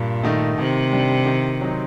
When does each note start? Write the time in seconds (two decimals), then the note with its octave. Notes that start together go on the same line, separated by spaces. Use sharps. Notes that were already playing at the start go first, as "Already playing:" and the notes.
Already playing: G2 A#2
0.23 D#3 A3 D#4
0.58 C3 D#3
0.93 G3 D4
1.26 D#3
1.61 F#3 C4 D#4